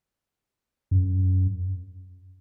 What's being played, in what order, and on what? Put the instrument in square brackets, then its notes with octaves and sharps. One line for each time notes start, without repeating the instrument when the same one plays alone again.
[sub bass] F#2